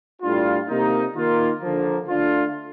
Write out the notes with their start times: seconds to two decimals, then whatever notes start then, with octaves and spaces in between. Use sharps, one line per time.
0.22 A2 G3 D4 F4
0.68 C3 D#3 A#3 D#4
1.14 D#3 A#3 F4
1.61 D3 F3 A#3
2.08 D3 A3 D4 F4